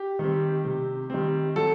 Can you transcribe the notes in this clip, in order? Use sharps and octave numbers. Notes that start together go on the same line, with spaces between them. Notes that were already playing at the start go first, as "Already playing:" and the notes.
Already playing: G4
D#3 G3 C4
C3
D#3 G3 C4
F#3 A4